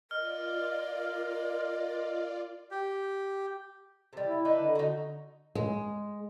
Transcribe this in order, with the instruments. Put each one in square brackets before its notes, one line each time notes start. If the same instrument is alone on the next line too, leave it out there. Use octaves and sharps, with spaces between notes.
[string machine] F4 D5 [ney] A#4 [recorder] D#5 [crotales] F6
[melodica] G4
[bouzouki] C3 G3
[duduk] E4
[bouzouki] D4 D#4 B4
[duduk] D3
[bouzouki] D#4 F#4
[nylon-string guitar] G#3